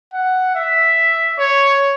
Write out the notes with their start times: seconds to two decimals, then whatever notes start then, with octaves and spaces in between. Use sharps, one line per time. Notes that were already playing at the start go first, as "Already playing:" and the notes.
0.13 F#5
0.55 E5
1.38 C#5